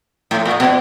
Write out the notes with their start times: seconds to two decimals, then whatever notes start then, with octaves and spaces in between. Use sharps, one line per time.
0.31 A2
0.46 A#2
0.60 B2